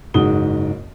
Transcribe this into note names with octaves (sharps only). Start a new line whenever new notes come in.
F#1 G#2 F#4 D#6 G7